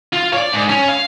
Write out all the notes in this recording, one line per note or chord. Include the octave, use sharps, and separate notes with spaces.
F4
C#5 D5
G#2
C#4
F5